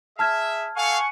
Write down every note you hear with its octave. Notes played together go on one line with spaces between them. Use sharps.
G#4 E5 A5 F6 G#6
A4 F5 F#5 G#5 C#6